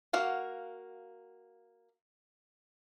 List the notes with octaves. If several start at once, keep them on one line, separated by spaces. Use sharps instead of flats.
A#3 F#4 F5 F#5